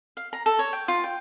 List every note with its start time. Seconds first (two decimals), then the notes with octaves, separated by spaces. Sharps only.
0.17 F5
0.33 A#5
0.46 A4
0.59 C#5
0.73 G5
0.88 F4
1.04 G5